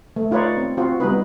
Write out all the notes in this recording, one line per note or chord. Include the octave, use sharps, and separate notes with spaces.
A3
D#4 F4 B4 C#5 D5
C4
C4 F4 F#4
G3 B3 D#4 B4